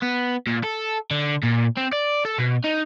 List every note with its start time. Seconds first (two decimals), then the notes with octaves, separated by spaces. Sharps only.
0.02 B3
0.47 A#2
0.64 A4
1.11 D3
1.44 A#2
1.77 C4
1.93 D5
2.25 A4
2.38 B2
2.64 D#4